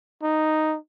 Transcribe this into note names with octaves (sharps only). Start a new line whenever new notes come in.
D#4